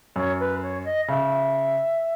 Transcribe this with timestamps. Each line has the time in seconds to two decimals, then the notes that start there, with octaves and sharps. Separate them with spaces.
0.16 F#2 C#5
0.39 B4
0.62 C#5
0.84 D#5
1.08 C#3 E5